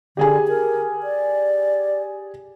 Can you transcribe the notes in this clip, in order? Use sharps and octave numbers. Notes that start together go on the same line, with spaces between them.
D3 G4 G#4 G#5
A#4
D5